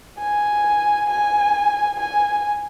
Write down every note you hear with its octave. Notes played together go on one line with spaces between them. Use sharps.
G#5
G#5
G#5